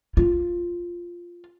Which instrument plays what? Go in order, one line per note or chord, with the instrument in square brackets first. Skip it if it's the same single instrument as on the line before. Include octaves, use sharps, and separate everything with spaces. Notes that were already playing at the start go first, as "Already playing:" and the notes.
[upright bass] F4